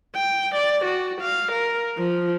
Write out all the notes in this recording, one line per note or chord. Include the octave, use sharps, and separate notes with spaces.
G5
D5
F#4
F5
A#4
F3